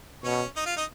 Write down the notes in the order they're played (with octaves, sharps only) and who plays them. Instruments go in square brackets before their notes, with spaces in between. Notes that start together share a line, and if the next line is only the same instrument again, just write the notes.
[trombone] B2 [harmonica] C#4 C#5
[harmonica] D#4 D#5
F4 F5
D#4 D#5